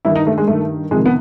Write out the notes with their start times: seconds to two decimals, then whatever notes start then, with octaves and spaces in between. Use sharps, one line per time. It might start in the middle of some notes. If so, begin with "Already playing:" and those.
0.05 G2 D#3 E4
0.16 D#4
0.27 A3
0.38 G#3
0.47 G2 D#3 A3
0.91 F2 C3 D#3 G#3
1.06 B3